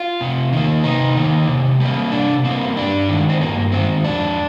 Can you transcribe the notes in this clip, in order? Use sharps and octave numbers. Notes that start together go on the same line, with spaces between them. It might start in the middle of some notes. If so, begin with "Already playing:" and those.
Already playing: F4
C3
D#3 A#3
C3 D#4
D#3 A#3
C3
G3 A#3
C3 D4
G3 A#3 C4
G2 D4
D#3 G#3
C4
G2 A#3
D#3 G#3 C4
F2 D4